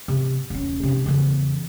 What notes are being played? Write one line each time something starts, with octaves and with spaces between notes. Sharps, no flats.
C3
D#1 C#4
C3 D#4
E2 C#3